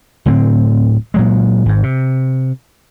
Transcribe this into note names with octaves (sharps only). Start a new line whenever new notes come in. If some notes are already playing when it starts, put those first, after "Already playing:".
D1 A2 D3 C4
A#2 F#3 G#3
G#1 G#2
C3